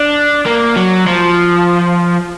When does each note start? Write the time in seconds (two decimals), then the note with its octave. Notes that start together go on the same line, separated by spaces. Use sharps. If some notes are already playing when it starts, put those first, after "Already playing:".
Already playing: D4
0.46 A#3
0.76 F#3
1.07 F3